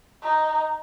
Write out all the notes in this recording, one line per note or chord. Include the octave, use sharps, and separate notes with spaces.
D#4